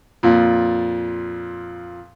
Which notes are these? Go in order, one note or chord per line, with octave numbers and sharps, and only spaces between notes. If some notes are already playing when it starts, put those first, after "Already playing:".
F2 A#2